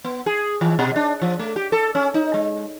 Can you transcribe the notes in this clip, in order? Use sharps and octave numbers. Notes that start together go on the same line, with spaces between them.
B3
G#4
E3
B2
D4
F3
A3
G4
A4
C#4
D#4
G#3